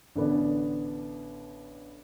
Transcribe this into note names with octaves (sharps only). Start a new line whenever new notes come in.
A1 D3 B3 D4